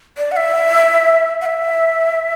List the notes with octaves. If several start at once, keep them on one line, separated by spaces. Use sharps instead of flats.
D5
F#5
E5
F#5
E5